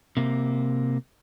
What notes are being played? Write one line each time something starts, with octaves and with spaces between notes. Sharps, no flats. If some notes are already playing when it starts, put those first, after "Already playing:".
C3 A#3